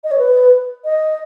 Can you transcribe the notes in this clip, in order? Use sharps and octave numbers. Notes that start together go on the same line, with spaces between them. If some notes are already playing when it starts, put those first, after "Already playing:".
D#5
C#5
B4
D#5